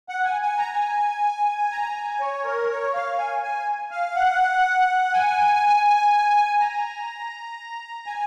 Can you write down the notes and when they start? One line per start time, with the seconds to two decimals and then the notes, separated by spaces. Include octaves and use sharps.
0.09 F#5
0.25 G#5
0.42 G#5
0.58 A#5
0.74 G#5
1.72 A#5
1.96 G#5
2.20 C#5
2.45 A#4
2.70 C#5
2.94 F5
3.18 G#5
3.42 G#5
3.91 F5
4.16 F#5
5.14 G#5
6.60 A#5
8.06 G#5